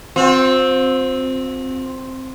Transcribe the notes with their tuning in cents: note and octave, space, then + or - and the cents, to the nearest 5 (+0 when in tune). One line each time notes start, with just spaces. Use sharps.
C4 +0 F4 +45